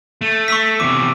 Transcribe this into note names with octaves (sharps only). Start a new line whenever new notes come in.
A3
C#6 E6 B6
E2 C3 D6